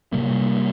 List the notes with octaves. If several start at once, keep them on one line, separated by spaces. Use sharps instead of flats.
C3 G3 A#3